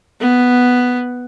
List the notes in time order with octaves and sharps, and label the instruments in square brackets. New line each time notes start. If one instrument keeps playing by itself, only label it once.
[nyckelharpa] B3